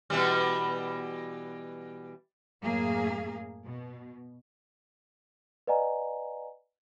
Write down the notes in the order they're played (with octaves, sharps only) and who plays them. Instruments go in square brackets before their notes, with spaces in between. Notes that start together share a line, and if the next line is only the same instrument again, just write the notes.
[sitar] B2 E3 G3
[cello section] F#2 A2 A#3 G#4 F5
B2
[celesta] B4 D5 D#5 F#5 G#5 A#5